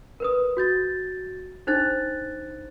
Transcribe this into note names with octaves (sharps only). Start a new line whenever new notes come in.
A#4 B4 D#6
F#4 G6 A6
D4 D#4 C5 F#6 A6